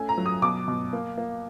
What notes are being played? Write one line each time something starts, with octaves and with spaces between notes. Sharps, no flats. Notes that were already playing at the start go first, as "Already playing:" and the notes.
Already playing: A3 C#4 G#5
A#5
F#3
D#6
B2 D6
B2
A#3
A#3